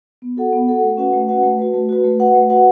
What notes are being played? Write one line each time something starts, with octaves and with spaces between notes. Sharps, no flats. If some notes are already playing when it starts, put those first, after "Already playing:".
B3
F#4 A4 F#5
B3
F#4 A4 F#5
A3
C#4 F#4 B4 F#5
A3
C#4 F#4 B4 F#5
A3
F#4 B4
A3
F#4 B4
A3
F#4 B4 F#5
A3
F#4 B4 F#5